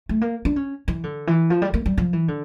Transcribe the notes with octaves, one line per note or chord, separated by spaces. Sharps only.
A3
A#3
D4
C#4
E3
D3
E3
F3
G3
A#3
G3
F3
E3
D3